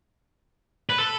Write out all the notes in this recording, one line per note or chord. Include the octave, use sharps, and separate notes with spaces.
B4
A4